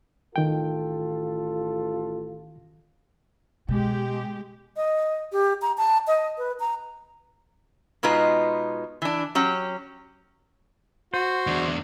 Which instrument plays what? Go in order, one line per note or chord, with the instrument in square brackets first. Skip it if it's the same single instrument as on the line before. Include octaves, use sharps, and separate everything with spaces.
[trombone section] A1 F4 A4 [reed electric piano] D#3 G5
[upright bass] B2 [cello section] G#3 G4
[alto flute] D#5
G4
A#5
A5
D#5
B4
A#5
[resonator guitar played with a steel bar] B2 G#3 D#4 F4 B4
E3 D4
F#3 C#4 G4
[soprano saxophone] F#4 [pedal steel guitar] C5
[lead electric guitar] E2 D4